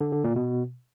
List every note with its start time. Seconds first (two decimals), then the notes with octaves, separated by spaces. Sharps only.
0.01 D3
0.12 D3
0.24 A#2
0.36 B2